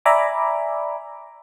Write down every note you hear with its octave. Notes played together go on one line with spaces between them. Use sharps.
D5 E5 G#5 A#5 B5 D6